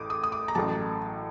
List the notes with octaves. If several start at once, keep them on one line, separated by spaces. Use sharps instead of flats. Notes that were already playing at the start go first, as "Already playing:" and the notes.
Already playing: A1 A2 D6 D#6
D#6
D#6
D6
A#5
A1 A2 F#3 A5